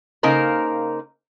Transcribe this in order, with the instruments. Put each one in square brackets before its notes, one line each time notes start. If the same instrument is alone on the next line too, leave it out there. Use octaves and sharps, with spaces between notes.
[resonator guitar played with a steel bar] C#3 A#3 D#4 A#4 C5